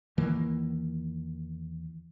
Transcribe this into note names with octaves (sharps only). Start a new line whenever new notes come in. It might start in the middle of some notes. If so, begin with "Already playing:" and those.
E2 D#3 E3 A#3